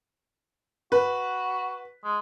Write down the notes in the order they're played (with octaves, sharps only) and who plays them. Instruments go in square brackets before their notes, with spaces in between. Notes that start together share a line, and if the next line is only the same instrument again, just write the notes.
[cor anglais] F#4 [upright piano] B4
[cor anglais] G#3